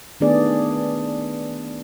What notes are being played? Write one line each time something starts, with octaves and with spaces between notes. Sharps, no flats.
D#3 A3 B3 D4 G#4 D5